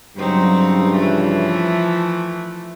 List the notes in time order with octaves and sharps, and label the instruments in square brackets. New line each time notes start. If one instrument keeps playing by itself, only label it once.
[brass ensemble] G2 C#3 [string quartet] F#3 C4 D#4
[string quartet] E3 F3 A3